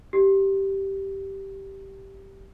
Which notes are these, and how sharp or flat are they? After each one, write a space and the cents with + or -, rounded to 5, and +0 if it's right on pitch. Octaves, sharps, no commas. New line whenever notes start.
G4 -10